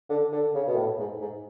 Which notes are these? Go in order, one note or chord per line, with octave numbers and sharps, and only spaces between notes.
D3
D3
C#3
B2
A2
G#2
G#2